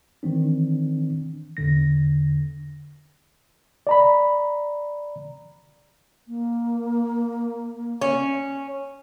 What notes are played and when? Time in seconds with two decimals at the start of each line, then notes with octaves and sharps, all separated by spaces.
0.23 D#3 E3 C4 D4
1.57 E2 D3 A#6
3.87 D5 A#5 B5
6.28 A#3
8.02 C#4